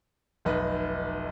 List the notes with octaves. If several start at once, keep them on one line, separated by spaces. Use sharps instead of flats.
F1 B1 B4 D#5